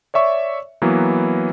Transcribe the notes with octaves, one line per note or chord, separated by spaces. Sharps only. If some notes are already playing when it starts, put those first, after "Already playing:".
C#5 D5 E5 C#6
E3 F#3 A#3 B3